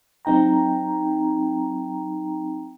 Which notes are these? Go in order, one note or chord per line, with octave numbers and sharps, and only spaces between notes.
F#3 C4 D#4 G5 A#5